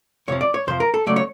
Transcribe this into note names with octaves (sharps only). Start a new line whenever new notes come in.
F2 C3 F3 C#5
D5
C#5
F2 C3 F3 C5
A#4
A4
C#3 F#3 A3 D5
C#5